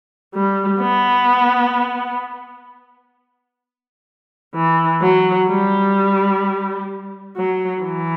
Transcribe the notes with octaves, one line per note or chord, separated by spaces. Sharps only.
G3
B3
E3
F#3
G3
F#3
E3